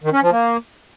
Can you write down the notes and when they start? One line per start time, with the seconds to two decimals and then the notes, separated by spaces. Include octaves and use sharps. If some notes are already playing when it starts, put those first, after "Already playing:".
0.04 D#3
0.13 C#4
0.22 F3
0.32 A#3